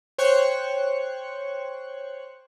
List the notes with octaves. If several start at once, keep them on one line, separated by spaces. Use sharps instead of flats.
C5 C#5 G5 C#6 F#6